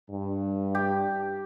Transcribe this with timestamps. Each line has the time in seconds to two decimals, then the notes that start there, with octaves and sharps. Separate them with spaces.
0.11 G2
0.75 G4